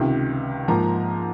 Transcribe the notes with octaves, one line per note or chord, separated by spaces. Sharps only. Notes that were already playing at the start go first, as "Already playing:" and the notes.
Already playing: C#2 C3 D#3
G#2 F3 A#3 A#5